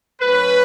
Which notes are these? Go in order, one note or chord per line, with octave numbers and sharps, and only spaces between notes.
A2 F#3 C#4 B4